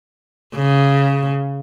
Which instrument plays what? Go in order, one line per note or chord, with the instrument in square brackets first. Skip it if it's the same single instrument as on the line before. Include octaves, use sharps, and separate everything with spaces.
[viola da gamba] C#3